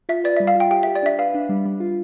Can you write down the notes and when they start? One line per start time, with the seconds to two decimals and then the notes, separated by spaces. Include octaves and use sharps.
0.09 F4 E5
0.24 B4 D5
0.37 G3 E5
0.47 F5
0.55 F4 G5
0.71 G4 G5
0.83 G4 E5
0.95 D5
1.03 D4 E5
1.18 B4 F5
1.34 D4
1.49 G3
1.65 G3
1.80 F4